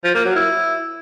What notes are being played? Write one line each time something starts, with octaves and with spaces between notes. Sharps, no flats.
F3
A#3
F#3
E4